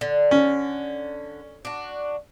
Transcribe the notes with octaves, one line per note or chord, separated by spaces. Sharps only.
D3
C#4
D4 F#4